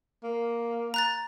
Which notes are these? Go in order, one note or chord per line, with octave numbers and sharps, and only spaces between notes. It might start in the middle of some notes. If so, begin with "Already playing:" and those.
A#3
A#5 F#6 A6